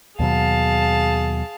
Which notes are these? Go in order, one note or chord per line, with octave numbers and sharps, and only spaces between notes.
D#2 B2 F#3 G#4 F5 A5